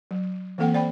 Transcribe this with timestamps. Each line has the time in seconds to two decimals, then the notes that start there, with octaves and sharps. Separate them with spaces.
0.11 F#3
0.58 E3 A#3 C4 A4 F#5 G5
0.73 C5 D5 G5 B5